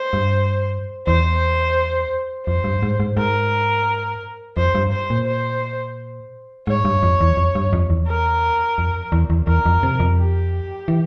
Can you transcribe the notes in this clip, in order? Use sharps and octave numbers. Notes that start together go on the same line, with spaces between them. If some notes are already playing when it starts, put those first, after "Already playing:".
Already playing: C5
G2
E2 C5
F2 C5
G2
G#2
G#2
G#2 A#4
F2 C5
G2
C5
A#2
C5
G#2 C#5
G2
F2
E2
F2
G2
F2
E2
A#4
F2
E2
E2
E2 A#4
F2
C3
F2
G4
E3